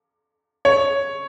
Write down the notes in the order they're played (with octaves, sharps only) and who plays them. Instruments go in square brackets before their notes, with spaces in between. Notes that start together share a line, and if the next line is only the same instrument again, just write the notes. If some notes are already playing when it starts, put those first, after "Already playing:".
[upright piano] C#5